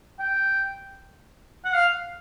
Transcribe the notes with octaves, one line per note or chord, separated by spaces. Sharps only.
G5
F#5
F5